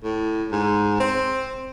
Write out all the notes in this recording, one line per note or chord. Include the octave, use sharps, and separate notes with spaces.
A2
G#2
C4